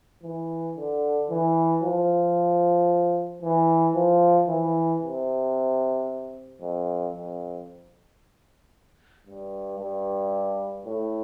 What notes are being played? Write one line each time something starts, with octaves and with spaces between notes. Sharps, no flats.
E3
D3
E3
F3
E3
F3
E3
C3
F2
F2
G2
G2
A2